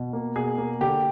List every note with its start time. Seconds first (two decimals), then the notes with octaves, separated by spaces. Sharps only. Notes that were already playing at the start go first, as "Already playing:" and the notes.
Already playing: B2
0.13 A#3
0.36 B2 G#4
0.58 A#3
0.81 D3 G4